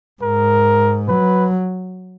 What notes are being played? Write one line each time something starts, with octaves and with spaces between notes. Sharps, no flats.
G#2 A#4
F#3 B4